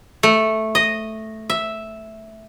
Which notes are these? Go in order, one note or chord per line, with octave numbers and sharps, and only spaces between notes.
A3
D#5
E5